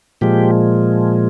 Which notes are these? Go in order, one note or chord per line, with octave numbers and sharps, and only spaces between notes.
A#2 F3 G#3 G4